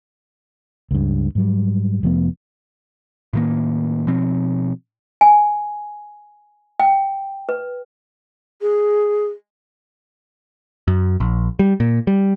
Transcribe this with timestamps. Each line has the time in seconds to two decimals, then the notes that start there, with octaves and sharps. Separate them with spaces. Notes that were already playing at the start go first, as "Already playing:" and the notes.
0.91 C#2 G2
1.35 G#2 F#3 G3
2.03 F1 F3 A3 B3
3.33 A2 D#3 A#3
4.07 B2 F3 C4
5.21 G#5
6.80 G5
7.49 B4
8.62 G#4
10.88 F#2
11.20 A#1
11.59 G3
11.80 A#2
12.07 G3